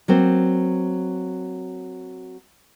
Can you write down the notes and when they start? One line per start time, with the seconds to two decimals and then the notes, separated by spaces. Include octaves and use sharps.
0.08 F#3 A#3 C4